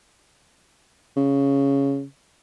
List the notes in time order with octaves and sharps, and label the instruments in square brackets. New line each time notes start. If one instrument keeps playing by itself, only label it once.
[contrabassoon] C#3